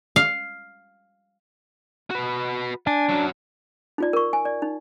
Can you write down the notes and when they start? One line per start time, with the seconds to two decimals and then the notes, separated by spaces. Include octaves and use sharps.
0.16 F5
2.11 F#4 B4
2.87 D4 G#5
3.09 F#2 F#3
3.98 D#4 F4 D5
4.13 A#4 C#6
4.33 G#5
4.45 D5
4.62 D#4